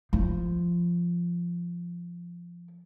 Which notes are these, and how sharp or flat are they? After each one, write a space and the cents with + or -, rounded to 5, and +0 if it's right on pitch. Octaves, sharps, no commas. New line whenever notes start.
F3 -10